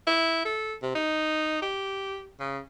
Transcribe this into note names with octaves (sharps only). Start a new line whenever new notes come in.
E4
A4
C3
D#4
G4
C#3